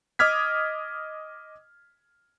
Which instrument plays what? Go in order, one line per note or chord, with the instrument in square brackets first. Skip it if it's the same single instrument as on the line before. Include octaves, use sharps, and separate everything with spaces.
[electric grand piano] D#5 D6 D#6 F6 G#6 B6